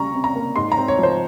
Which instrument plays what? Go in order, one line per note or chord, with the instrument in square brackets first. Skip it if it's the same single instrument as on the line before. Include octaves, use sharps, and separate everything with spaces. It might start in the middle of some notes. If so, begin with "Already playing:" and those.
Already playing: [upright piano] G3 C#4 A#5 C#6
C3
A#5
A#3
G#2 C6
A#5
C4
C#5
F3
C5